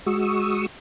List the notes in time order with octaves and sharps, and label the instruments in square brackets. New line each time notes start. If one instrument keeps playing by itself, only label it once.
[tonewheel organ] G#3 F#4 C#6 D#6 E6